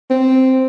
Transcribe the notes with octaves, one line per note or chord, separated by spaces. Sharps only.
C4